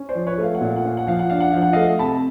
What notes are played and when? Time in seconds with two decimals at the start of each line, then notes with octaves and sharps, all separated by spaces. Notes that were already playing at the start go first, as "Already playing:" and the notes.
Already playing: C#4
0.09 C5 D5
0.15 F3
0.27 B4 C#5
0.38 A3
0.44 F5
0.54 F#5
0.61 A#2 F5
0.76 F#5
0.84 C#4 F5
0.97 F#5
1.07 F3 F5
1.19 F#5
1.30 D4 F5
1.40 F#5
1.51 F3 F5
1.62 F#5
1.73 D#5 F5
1.76 A3
1.99 C3 A5 B5